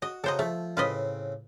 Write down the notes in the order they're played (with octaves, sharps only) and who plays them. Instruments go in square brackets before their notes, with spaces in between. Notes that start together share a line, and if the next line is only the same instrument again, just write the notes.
[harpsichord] F#4 [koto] D#5
[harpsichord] C#3 F#4 A#5 [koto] A4 C5 D#5
[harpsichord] F3 E5 [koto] A3
[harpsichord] A2 C#3 C4 [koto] F4 B4 D#5